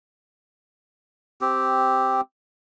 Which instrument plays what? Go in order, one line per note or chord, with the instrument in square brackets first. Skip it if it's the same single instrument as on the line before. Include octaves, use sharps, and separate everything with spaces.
[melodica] C4 G4